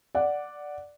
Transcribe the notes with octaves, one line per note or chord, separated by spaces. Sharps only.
D5 F#5